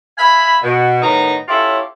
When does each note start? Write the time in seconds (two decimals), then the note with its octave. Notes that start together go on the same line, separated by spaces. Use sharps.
0.17 E5 F5 G#5 B5
0.63 B2
1.01 A2 D#3 B3 D#4 A#5
1.48 C#4 E4 F4 G4 A4 C#5